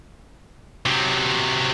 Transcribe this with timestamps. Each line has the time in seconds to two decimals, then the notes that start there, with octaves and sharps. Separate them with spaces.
0.86 C3 F#3